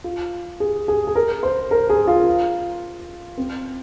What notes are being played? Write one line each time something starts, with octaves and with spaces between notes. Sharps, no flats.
F4
G#4
G#4
G#4
A#4
C5
A#4
G#4
F4
C4